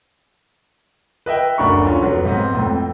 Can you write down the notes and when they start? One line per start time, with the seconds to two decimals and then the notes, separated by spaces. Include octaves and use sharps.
1.26 B4 D#5 E5 G5
1.58 F#1 D2 D4 A#4 B5 C#6
1.85 C#4 F4
2.02 F1 F#3 B4
2.25 G#2 B3 C4
2.55 F2 A2